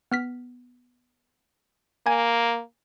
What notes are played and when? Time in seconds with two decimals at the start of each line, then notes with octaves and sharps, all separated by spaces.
0.12 B3 F6 B6
2.06 A#3 G#5 G#6